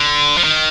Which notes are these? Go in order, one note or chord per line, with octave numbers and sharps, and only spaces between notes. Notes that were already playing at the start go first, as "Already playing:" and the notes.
Already playing: D3
F3
D#3